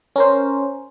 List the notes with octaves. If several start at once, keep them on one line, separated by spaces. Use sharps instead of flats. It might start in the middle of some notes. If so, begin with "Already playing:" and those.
C#4 A#4 C5